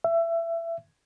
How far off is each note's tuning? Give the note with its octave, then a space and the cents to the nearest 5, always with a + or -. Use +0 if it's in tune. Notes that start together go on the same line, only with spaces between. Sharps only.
E5 +25